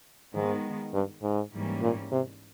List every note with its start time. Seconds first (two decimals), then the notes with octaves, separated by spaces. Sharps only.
0.34 G#2 D#3 G#3 B3
0.93 G2
1.22 G#2
1.52 G#2 E3 G3 A#3 C#4
1.81 A#2
2.12 C3